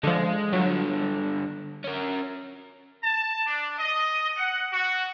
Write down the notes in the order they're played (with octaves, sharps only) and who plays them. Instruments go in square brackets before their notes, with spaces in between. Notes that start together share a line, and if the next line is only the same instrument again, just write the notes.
[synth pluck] D3 F3 [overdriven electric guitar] G#3
[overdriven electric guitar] G2 D3 [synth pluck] F#3
[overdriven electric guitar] C#4 A#4
[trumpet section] A5
D4
D#5
F#5
F#4